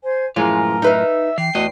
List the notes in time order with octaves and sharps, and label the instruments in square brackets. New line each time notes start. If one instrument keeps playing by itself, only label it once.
[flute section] C5 G#5
[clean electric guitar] F#2 A2 F4 [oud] E3 F3 G#3 [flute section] A#4
[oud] D#4 B4 F5 [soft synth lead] E5
[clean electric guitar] E3 [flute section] G5 [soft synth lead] C7
[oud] E2 [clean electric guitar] A3 F#4 D#5